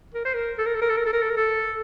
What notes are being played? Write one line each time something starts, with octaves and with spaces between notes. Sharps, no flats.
A#4
C5
A#4
A4
A#4
A4
A#4
A4
A#4
A4
A#4
A4
A#4
A4